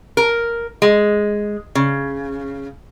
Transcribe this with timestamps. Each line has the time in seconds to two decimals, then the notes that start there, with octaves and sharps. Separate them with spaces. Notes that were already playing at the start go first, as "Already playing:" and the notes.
0.17 A#4
0.82 G#3
1.75 C#3